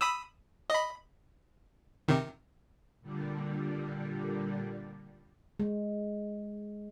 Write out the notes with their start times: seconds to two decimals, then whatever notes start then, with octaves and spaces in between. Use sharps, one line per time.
0.01 B5 D#6 E6
0.70 D#5 B5
2.08 C3 D#3
3.01 A#2 D3 G3
5.60 G#3